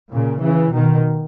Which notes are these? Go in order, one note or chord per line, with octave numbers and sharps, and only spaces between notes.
A#2 C#3
C#3 E3
B2 D#3